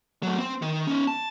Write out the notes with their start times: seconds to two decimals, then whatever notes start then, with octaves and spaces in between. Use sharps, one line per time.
0.23 F#3 A3
0.38 C4 C5
0.62 D#3
0.87 C#4 D#4
1.07 A5